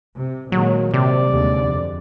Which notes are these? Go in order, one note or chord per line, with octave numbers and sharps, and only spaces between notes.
C3
A#2 D#3 F#3 G#3
C3 G3 D5
D#2 D3 G#3
F2